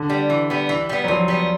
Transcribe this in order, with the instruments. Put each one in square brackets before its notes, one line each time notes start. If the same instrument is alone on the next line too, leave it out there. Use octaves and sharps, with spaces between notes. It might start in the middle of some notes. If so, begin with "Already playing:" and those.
Already playing: [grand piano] D3
[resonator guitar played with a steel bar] G3 B3
E3
G3 B3
E3
G3 B3
[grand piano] F#3
[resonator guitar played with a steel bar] E3 [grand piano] F3
[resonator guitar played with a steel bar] G3 B3